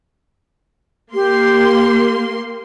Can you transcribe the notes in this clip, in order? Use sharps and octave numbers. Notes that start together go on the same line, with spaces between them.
A#3 G4 C6